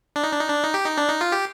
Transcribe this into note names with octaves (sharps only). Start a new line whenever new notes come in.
D4
D#4
D4
D#4
D4
D#4
G4
D#4
D4
D#4
F4
G4